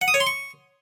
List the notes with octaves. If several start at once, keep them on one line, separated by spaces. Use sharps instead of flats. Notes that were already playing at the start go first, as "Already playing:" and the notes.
F#5
D#6
C#5
C6
C#6